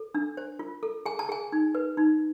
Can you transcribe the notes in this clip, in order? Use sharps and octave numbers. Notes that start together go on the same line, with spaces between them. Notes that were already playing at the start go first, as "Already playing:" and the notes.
Already playing: A4
D4
C5
F4
A4
G#4 G#5
A5
G#4 G#5
D#4
B4
D#4